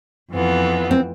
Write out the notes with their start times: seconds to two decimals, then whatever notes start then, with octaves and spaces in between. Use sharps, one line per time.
0.32 F2 E3 B3 F4
0.91 C4